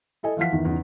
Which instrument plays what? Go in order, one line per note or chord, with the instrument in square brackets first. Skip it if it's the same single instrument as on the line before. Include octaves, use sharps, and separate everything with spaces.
[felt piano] E4 A4 D#5 G#5
E3 F3 F5 F#5 B6
E2 D#3 E3
E2 C#3 D#4